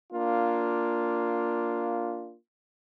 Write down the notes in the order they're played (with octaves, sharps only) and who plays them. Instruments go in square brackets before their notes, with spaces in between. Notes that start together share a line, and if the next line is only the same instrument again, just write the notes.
[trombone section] A#3 D4 F4